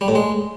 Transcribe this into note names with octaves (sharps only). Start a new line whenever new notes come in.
G3
A2
G#3